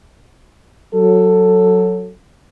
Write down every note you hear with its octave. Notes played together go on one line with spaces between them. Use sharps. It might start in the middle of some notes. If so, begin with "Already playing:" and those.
F#3 A4